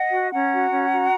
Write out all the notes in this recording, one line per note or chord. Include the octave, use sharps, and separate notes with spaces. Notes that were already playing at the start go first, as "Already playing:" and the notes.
Already playing: D#5 F#5
F#4
C#4 F#5 A#5
F#4
C#4
F#4